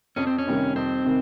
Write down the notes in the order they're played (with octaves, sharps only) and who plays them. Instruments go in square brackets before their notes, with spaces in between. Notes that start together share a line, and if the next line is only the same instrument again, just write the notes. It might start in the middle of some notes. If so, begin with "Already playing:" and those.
[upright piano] F2 [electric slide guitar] C#4
[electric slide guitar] C4
C#4
[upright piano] C3 D#3 G3
[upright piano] F2 [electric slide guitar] C4
[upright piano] C3 D#3